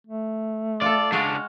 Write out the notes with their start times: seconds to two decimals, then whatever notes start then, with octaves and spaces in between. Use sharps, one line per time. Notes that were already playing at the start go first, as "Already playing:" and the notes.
0.07 A3
0.82 F4 A4 D5
1.12 C#2 G#3 D4 F#4 F5